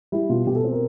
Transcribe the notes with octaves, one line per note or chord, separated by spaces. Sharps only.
G3 E4
B2 F4
B2 G4
A4
C4
A#4